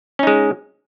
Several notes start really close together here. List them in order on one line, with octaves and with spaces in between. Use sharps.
C#4 D#4 G#3